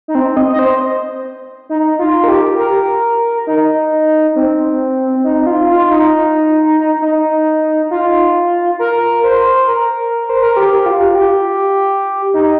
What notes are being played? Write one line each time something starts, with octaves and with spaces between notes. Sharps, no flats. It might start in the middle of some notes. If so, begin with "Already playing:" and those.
D#4
C4
D#5
D#5
C5
D#4
F4
A#4
G4
A#4
D#4
C4
D#4
F4
F4
D#4
D#4
F4
A#4
C5
A#4
C5
A#4
G4
F4
G4
D#4